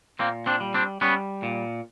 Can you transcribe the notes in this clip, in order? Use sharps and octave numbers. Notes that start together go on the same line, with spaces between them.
A#2 A#3 C4
C4 D4
G3
C4 D4
G3 B3 C#4
A#2